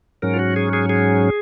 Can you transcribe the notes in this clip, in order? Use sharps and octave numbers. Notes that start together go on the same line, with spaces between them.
G#2 F#3 C#4 A#4
F4
F#4
G#4
G#4
G#4